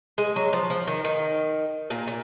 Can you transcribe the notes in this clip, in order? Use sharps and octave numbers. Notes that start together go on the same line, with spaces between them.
G#3
F#3
F3
F3
D#3
D#3
A#2 A#3
A#2